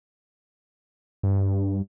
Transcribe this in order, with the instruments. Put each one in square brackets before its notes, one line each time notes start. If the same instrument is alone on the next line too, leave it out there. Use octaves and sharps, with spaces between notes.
[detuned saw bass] G2